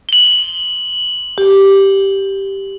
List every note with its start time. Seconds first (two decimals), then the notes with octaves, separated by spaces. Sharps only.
0.09 F#7 G7
1.38 G4